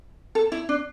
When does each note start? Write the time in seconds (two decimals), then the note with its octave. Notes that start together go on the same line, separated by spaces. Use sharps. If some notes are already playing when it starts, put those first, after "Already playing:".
0.35 A4
0.52 E4
0.69 D4